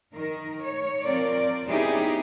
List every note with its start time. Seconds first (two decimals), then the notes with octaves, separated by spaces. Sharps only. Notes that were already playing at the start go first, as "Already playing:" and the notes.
0.13 D#3 A#4
0.62 C#5
1.04 F3 C4 A#4 D5
1.66 B3 C#4 D#4 E4 G4 G#4